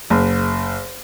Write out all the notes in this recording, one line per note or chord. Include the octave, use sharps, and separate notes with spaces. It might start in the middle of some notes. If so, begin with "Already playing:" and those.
F#1